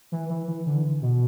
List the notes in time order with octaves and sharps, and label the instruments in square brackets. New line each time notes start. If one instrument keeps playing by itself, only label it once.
[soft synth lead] E3
E3
E3
D3
B2